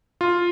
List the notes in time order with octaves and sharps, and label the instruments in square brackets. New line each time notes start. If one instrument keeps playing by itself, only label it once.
[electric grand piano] F4